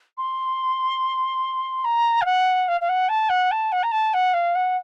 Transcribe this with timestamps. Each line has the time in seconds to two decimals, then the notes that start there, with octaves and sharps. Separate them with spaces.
0.17 C6
1.84 A#5
2.21 F5
2.25 F#5
2.68 F5
2.81 F5
2.89 F#5
3.09 A5
3.29 F#5
3.51 A5
3.72 F#5
3.83 A#5
3.91 A5
4.13 F#5
4.33 F5
4.55 F#5